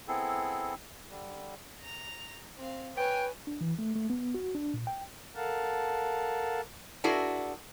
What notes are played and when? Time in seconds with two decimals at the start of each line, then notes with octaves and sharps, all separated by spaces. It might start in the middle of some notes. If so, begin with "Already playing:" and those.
0.08 B3 C4 E4 G#4 A4
1.10 D3 G3
1.81 A#5 F7
2.58 C4 F5
2.97 B4 C#5 G5 G#5
3.47 D4
3.61 E3
3.79 A3
3.95 A3
4.10 B3
4.34 F#4
4.55 D4
4.74 A#2
4.87 G5
5.36 A4 A#4 F5 F#5 A5
7.04 D4 E4 F#4 G#4 A#4